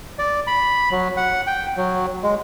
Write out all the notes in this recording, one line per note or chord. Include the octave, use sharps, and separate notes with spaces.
D5
B5
F#3
F#5
G5
F#3
G#3